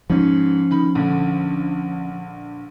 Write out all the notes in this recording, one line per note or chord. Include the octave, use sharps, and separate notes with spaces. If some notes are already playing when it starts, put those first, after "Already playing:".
G#2 F3 C#4
D#3 B5
A#1 D3